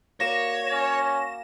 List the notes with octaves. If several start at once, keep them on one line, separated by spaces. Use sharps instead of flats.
A#3 F#4 C#5 D5 A#6 E7
C#4